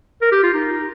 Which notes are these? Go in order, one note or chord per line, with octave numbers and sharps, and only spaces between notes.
A#4
G4
F4
D#4